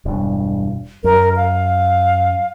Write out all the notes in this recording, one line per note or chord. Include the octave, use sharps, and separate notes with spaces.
E1 G2
F#2 A#4
F5